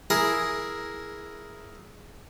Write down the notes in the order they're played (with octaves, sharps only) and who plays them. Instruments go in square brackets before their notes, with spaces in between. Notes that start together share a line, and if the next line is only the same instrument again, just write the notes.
[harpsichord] E4 G#4 A#4